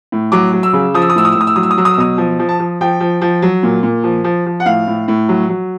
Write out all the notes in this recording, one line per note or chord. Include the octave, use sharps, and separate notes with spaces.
A2
F#3 D6
F#3
E6
C#3
F3 D#6
E6
D#6
A2 E6
D#6
E6
A2
D#6
E6
F#3 D#6
E6
D#6
F#3 E6
D#6
E6
B2 D#6
F3
F3
A5
F3
F3 G5
F3
F3
F#3
A#2
A#2
F3
F3
F3
F#5
A2 F5
A2
A2
F#3
F#3